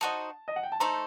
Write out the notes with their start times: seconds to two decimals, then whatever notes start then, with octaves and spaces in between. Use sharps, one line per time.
0.01 D#4 F#4 C5 D#5 A5
0.48 D#5
0.56 F#5
0.63 G5
0.72 A5
0.80 A3 D#4 A4 C5 A#5